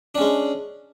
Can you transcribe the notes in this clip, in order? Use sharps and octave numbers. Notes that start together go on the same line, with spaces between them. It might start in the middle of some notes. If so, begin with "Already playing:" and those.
G#3 C#4 D4